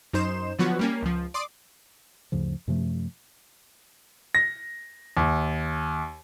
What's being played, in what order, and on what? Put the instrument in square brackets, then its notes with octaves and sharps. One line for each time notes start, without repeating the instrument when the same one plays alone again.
[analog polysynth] F#2 D#4 C5 E7
D3 F3 F#3 B3 F#4 B4
G3 A#3 C#4
C#2 F3
D5 C6 D6 D#6
[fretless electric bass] D2 G2 C#3 F3
F#2 C3 F3 A3
[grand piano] A#6
D#2